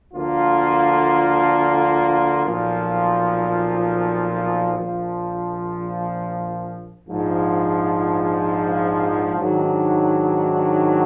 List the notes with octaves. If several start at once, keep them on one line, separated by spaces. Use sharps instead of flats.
D2 D3 F3 A#3 F4
B1 A#2 F3
A#1 A#2 F3
A#1 G#2 F3
G#2 D#3 F#3 D4